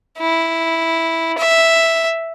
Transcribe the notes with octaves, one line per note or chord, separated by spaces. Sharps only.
E4
E5